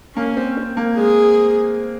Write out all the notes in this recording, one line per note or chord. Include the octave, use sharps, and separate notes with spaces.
A#3 C#4
C4
C4
A#3
G#3 G#4